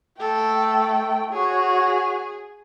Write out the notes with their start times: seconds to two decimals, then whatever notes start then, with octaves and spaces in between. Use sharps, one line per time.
0.20 A3 A4 G5
1.33 F#4 G#4 C#5